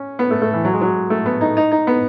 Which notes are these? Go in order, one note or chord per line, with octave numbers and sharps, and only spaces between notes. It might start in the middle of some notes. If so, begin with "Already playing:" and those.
Already playing: C#4
B3
A3
A3
E3
F#3
G#3
F#3
A3
B3
D#4
D#4
D#4
B3